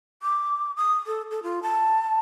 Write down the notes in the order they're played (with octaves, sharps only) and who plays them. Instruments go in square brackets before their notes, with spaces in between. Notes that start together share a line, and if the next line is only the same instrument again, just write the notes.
[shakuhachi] D6
D#6
A4
A4
F4
A5